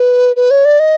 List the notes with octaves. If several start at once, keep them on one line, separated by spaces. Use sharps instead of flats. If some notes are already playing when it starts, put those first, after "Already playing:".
Already playing: B4
B4
C#5
D5
D#5